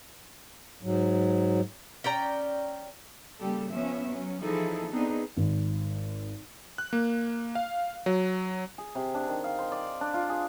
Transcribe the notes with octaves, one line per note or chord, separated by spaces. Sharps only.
G#2 F#3
C#4 D5 G5 A#5
C#3 G3 A#3 G4 A4
F3 B3 C#4 E5
F#3 C#4
E3 F3 D#4 E4 G#4 A4
B3 C4 D4 D#4 G#4
G#1
F#6
A#3
F5
F#3
G#4
C3
D4
D#3
F5
C5
D5
D4
F4
G#4